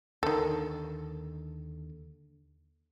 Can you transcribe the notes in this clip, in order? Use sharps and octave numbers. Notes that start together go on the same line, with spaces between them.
D#2 D3 D#3 A4